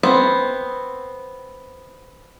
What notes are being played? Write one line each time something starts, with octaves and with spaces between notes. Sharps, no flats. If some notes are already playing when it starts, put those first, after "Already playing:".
B3 C4